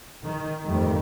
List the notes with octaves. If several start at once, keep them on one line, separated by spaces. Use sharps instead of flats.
D#3
F2 G#2 D#3 G3 A3